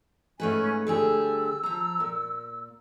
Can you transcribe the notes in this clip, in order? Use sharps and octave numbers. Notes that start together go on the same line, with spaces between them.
G#2 A3 C#4 B4 G#5
D3 G3 G#4 E6
F3 A#5
A#2